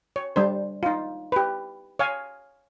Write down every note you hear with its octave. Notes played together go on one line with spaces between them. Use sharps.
C#5
G3 D4 C5
D#4 F4
G4 B4
C#5 F5 G#5